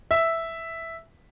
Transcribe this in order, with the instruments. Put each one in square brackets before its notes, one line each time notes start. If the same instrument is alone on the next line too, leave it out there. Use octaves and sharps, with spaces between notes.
[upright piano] E5